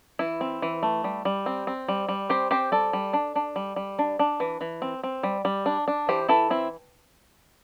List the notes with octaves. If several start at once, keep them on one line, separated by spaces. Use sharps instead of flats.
E3 E4
C4
E3
A3
G3
G3
C4
C4
G3
G3
C4 G4 C5
C4 G4 C5
G3 A4 D5
G3
D4
D4
G3
G3
D4
D4
E3
E3
C4
C4
G3
G3
D4
D4
E3 G4 C5
E3 E4 A4
C4 E4